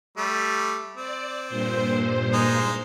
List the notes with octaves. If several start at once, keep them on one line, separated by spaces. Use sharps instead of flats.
G3 A3
C4 D5
G2 A#2 C5
G#3 D#4